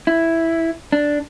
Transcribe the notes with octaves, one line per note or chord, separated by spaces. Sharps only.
E4
D4